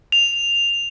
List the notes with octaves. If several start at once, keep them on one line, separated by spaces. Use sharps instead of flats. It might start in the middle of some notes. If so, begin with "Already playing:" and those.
F7